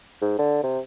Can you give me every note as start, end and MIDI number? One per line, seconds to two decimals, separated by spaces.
0.21 0.38 44
0.39 0.61 50
0.63 0.79 48